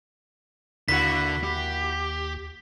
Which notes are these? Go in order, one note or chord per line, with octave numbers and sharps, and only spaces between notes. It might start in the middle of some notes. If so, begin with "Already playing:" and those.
D#2 D3 A#3 E4 F#4 B6
G4